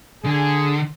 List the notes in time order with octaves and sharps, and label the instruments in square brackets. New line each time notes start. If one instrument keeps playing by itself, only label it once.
[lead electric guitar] D3 [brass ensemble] G#4